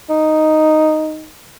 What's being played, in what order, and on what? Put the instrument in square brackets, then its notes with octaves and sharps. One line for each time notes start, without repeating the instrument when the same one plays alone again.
[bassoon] D#4